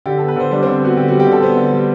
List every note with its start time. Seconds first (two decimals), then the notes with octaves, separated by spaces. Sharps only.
0.06 D3 G4
0.18 B3 A4
0.28 B4
0.36 D3 C5
0.51 G3 D4
0.63 D3 C4
0.82 B3 F#4
0.97 D3 G4
1.08 G3 F#4
1.20 G4
1.27 D3 A4
1.42 B3 C5
1.57 D3
1.72 G3